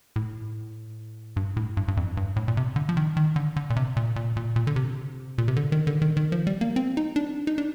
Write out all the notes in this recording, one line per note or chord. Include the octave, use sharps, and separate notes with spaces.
A2
G2
A2
G2
G2
F2
G2
A2
A#2
C3
D3
F3
D#3
D#3
D3
D3
A#2
C3
A#2
A#2
A#2
A#2
D3
C3
A#2
C3
D3
D#3
D3
D#3
D#3
F3
G3
A#3
C4
D#4
D4
D#4
D4